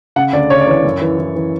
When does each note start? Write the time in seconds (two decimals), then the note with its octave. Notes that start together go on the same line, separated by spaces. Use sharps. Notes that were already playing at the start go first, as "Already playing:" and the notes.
0.16 C#3 F#5
0.33 D2 D5
0.50 C#3 C#5
0.61 D5
0.67 E3 C#5
0.85 F#2
1.02 E3
1.19 E3
1.36 E3